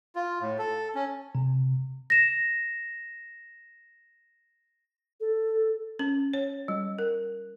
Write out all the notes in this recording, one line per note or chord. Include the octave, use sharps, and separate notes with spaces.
F4
A2
A4
C#4
C3
A#6 E7
A4
C#4
C#5
G3
A#4